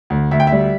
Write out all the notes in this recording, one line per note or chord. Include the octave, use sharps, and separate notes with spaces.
D2
D2 E5
G5
E5
G3